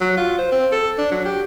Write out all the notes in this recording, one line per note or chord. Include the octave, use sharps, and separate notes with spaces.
F#3
F4
C5
C4
A4
D4
F#3
G4